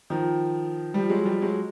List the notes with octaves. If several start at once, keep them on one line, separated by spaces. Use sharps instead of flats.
D#3 F3
F3 G3
F#3 G#3
F3 G3
F#3 G#3